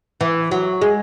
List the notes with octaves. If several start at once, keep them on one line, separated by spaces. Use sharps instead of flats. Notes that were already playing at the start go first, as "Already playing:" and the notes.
E3
F#3
G#3